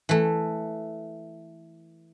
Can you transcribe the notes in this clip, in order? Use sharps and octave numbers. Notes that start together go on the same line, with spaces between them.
E3 A3